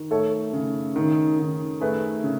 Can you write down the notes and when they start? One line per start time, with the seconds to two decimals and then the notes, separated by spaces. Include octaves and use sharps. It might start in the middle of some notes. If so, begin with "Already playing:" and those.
Already playing: D#3
0.11 A3 A4 C#5
0.53 C#3
0.96 D#3
1.39 D#3
1.80 A3 G#4 B4
2.24 C#3